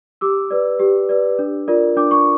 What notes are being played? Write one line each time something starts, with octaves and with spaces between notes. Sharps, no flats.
G4 D6 E6
B4 D5
G4
B4 D5
D4
F4 A#4 D5
D4 D6
C#6